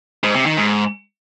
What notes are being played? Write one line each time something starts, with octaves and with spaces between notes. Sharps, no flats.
G#2
C3
D#3
G#2